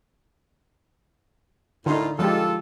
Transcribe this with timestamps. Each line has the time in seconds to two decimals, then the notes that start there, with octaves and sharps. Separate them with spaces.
1.86 A2 D3 D#4 F4
2.19 F3 G#3 F4 G4 A4